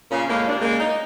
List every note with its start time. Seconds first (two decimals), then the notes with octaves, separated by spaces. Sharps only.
0.11 A#2 C#3 C#4
0.29 A2 G#3 A#3
0.48 D#2 D4
0.61 C#3 G#3 A#3
0.80 D#4